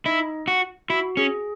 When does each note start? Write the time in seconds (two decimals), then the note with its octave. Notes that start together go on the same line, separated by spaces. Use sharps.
0.05 D#4 E4 D#5
0.48 F#4
0.89 E4 F#4
1.17 C#4 G#4